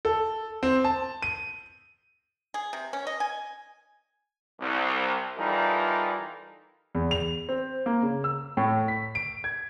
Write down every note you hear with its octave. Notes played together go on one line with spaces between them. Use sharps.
A4
C4
A5
D#7
G#4
C3
C#4
D#5
G#5
C2
E3 G3 D#4 F4 A4 A#4
E2
F7
C4
A#3
C#3
E6
A2
B6
D7
G#6